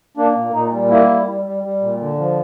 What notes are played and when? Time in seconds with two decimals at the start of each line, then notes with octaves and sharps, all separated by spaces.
0.17 A#3 D4
0.35 A#2
0.53 A#2 D#4
0.72 G3
0.90 A#3 E4
1.08 G3
1.27 G3
1.45 G3
1.63 G3
1.81 A#2
2.00 D3
2.18 F3